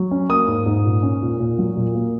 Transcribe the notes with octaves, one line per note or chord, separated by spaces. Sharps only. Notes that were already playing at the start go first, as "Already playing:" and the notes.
Already playing: F#3
C#4
A#3 D#6
G#2
G#2
A#2
C#4
A#2
A#2
F#3
A#2
A#3